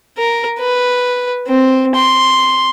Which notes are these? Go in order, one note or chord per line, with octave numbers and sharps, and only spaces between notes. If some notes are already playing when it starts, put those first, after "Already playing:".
A#4
B4
C4
C6